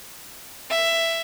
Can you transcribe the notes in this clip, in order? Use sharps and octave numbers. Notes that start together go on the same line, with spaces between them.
E5